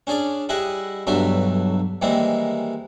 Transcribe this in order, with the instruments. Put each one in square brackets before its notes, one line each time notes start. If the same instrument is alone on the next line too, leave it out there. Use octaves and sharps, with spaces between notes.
[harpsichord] C#4 D4 G#4 D5
G3 E4 G#4 D#5 F#5
B1 G2 D3 F#3 E5 C6
D#3 E3 G3 G#3 A#3 C4